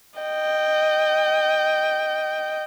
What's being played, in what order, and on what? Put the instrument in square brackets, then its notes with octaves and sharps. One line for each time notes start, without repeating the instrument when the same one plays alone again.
[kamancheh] D#5 G5